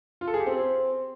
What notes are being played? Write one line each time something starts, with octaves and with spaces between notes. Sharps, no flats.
F4
A4
G#4
G4
C4